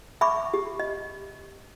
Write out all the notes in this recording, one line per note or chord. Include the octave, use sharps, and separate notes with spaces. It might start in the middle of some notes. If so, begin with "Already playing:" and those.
E5 B5 C#6 D6
G4
D#5